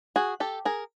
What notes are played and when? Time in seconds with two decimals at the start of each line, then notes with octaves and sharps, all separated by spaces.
0.16 F#4 G#4
0.40 G4 A4
0.65 G#4 A#4